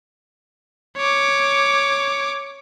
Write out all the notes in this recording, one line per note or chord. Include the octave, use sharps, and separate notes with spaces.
C#5 D6